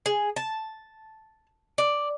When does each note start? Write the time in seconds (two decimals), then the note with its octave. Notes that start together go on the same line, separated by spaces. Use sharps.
0.06 G#4
0.36 A5
1.78 D5